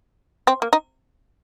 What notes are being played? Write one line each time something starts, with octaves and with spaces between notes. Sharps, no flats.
C4
A#3
D#4